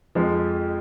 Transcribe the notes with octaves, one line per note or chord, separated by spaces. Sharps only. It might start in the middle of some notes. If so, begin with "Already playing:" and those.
F2 F3 G#3